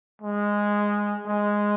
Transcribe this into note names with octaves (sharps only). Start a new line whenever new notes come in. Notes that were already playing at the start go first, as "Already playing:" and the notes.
G#3
G#3